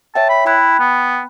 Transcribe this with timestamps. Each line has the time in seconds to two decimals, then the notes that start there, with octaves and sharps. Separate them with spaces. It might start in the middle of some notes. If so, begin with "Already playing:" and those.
0.15 C#5 E5 G5 A5
0.29 B5
0.46 E4 G5 B5 F#6
0.79 B3